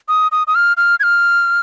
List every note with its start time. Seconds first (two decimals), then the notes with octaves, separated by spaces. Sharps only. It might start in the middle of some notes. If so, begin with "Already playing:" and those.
0.08 D#6
0.32 D#6
0.47 D#6
0.55 F6
0.77 F6
1.00 G#6
1.03 F6